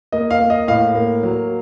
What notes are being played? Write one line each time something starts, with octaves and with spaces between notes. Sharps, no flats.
A#3 D#5
F5
A#3
D#5
A2 F5
A#3
F#3